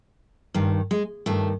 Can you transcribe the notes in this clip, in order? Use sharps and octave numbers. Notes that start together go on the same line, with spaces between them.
G2 D#3
G#3
G2 D#3 A3